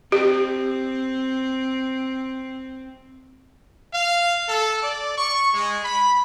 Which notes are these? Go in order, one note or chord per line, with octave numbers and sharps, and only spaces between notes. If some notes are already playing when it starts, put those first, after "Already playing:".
C4 G4
F5
A4
D5
C#6
G#3
B5